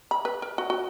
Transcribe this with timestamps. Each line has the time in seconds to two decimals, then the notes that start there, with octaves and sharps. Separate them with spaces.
0.11 B5
0.25 B4
0.42 A#4
0.58 F#4
0.70 F#4